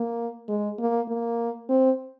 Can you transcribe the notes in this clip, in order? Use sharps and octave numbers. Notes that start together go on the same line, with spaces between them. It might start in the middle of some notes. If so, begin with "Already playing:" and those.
Already playing: A#3
G#3
A#3
A#3
C4